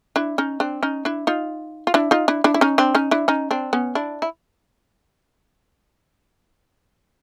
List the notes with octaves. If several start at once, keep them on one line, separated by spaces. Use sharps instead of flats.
D4 E4
C#4 D#4
C4 D4
C#4 D#4
D4 E4
D#4 F4
F4
D4 E4
D#4 F4
D4 E4
D4 E4
E4
C#4 D#4
C4 D4
C#4 D#4
D4 E4
C#4 D#4
C4 D4
B3 C#4
D4 E4
E4